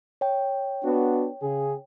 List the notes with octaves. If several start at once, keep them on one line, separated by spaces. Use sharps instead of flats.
C#5 G5
B3 D4 F#4
C#3 G#4